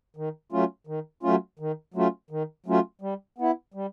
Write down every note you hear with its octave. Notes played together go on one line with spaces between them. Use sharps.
D#3
F#3 A3 C#4 F4
D#3
F#3 A3 C#4 F4
D#3
F#3 A3 C#4 F4
D#3
F#3 A3 C#4 F4
G3
B3 E4
G3